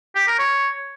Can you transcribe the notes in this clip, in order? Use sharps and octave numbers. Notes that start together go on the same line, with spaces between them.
G4
A#4
C#5